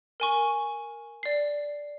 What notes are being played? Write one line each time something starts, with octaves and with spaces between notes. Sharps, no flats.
A#4 G#5 C#6
D5 C7